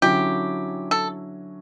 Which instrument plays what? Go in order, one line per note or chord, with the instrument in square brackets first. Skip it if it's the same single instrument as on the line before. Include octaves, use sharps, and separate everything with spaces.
[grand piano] D3 F#3 C#4 E4 [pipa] G4
[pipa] A4